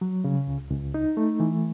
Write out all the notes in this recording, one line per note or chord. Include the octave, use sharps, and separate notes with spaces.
F#3
C#3
C#2
C#2
D#4
A3
E3